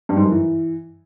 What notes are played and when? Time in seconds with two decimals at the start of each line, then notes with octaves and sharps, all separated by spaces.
0.09 G2
0.17 G#2
0.24 F#2
0.31 E3